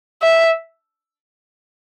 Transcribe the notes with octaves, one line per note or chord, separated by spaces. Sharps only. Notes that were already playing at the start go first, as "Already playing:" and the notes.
E5